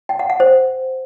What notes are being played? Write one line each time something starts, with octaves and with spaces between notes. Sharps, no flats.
G5
F#5
F#5
C5